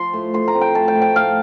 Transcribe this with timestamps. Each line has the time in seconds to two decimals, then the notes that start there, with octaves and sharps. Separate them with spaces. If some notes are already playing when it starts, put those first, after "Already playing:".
Already playing: F3 C6
0.13 A2
0.34 A2 C6
0.48 A#5
0.55 C4
0.61 G5
0.75 A3 A5
0.88 G5
0.95 A2
1.02 G5
1.16 A2 F5